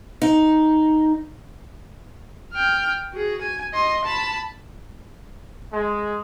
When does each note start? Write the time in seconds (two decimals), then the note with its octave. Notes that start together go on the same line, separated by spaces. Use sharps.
0.22 D#4
2.53 G5 F6
3.12 F#4 G#4
3.42 G#5
3.73 D#5 C6
4.05 A5 B5
5.73 G#3